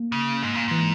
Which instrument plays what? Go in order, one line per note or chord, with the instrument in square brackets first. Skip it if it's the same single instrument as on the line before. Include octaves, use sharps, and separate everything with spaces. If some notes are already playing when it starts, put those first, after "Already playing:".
Already playing: [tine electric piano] A#3
[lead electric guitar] C#3
G#2
A#2
[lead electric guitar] G#2 [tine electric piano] E3